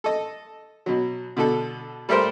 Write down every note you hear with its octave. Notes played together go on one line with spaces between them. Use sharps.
A4 D#5
B2 F#3
B2 D3 A4
G3 A3 G4 A#4 C5